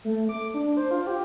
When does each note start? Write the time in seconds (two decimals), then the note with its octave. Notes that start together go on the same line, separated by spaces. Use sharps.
0.05 A3
0.29 D6
0.54 D4
0.77 C5
0.91 F4
1.07 G4